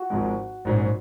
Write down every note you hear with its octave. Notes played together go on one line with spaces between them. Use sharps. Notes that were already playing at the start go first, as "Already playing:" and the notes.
Already playing: F#4
G#1 G#2 F3 G#3
A#1 G#2 F#3 C#4